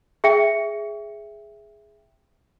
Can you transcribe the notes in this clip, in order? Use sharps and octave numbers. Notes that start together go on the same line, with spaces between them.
G#4 E5 G5 C#7